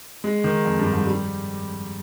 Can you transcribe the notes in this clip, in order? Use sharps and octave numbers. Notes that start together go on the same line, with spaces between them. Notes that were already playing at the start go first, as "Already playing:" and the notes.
G#3
D#3
F2
G2
G#2
G3